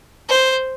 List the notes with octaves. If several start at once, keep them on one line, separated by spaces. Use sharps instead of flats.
C5